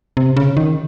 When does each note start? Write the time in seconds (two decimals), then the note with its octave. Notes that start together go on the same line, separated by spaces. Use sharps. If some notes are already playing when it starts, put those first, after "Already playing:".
0.17 C3
0.37 C#3
0.57 D#3